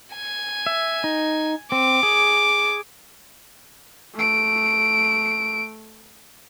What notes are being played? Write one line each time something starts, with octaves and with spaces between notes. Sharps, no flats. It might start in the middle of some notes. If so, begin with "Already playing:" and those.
G#5
E5
D#4
C4 D6
G#4
A3 D7